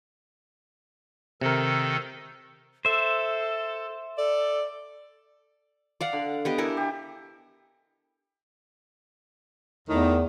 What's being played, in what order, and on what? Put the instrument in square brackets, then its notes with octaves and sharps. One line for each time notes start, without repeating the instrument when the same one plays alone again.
[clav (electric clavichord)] C3 A#4 [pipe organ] D#3 A4
[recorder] A4 [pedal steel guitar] C5 E5
[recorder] A4 [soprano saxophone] D5
[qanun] D5 F5 F#5
[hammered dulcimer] D3
[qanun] B3 G4 D#5
[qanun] E4 A4 A#4 [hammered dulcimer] G#5
[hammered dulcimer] G4
[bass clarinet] E2 [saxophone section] A2 D#3